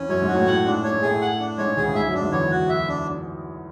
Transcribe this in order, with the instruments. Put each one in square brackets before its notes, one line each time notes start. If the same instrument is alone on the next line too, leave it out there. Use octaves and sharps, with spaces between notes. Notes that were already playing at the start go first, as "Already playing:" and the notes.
Already playing: [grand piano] E2 E3 [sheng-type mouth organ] C#4
[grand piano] F#2 F#3 [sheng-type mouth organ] C#5
[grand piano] G#2 G#3
[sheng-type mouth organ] F#4
[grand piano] A2 A3
[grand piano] A2 A3 [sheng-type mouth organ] F#5
[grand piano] G#2 G#3 [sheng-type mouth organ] D4
[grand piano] A3 [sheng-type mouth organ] C#5
[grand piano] G#3
[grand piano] A2 A3 [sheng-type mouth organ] G#4
[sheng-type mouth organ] F#5
D4
[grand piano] G#2 G#3 [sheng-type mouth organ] C#5
[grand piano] D2 D3 [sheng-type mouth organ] G#4
[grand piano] C#2 C#3
[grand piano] G#2 G#3 [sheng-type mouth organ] E5
[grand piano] F#2 F#3
[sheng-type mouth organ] D4
[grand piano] G#2 G#3
D3
[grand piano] E2 E3 [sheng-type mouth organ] C#5
[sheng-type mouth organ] F#4
E5
D4